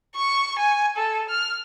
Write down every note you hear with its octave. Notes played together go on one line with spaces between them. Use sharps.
C#6
G#5
A4
F6